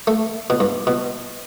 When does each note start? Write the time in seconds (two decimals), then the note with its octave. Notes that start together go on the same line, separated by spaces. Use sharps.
0.07 A3
0.50 B2
0.60 G2
0.87 B2